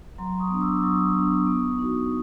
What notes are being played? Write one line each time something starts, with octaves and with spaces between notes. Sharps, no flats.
F#3 A#5 C6
C#6 D#6
B3 D4
D6 E6
E6
F#3 C#6 D#6
B3 D4
B3
D#4 F#4